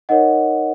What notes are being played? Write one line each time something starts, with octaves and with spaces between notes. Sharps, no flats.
D#4 A#4 C#5 D#5 F#5